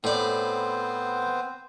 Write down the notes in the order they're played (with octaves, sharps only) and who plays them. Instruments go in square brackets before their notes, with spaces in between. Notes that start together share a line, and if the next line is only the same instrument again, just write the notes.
[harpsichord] A2 D5 [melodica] B3 C4 C5